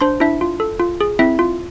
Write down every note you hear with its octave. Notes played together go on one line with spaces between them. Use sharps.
D4 C5 C6
D4 E4 E5
F4
A4
F4
G#4
C4 E4 E5
F4